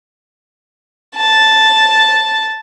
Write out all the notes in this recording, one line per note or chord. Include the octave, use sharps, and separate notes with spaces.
A5